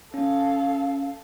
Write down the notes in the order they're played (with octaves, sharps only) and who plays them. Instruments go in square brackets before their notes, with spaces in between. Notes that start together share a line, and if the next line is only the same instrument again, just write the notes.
[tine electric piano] C#4 [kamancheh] A4 F5